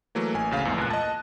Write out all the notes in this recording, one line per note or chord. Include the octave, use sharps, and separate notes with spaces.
E3 F#3 A3 A#3
A1 G#5
D2 C#3 F5
E2 G#2 F3 A3 C4
C#2 A#2 F#6
D#5 A5